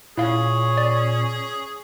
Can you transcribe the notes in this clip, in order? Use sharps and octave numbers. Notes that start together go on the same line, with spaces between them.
A#2 C#4 E4 G#4 F5
D5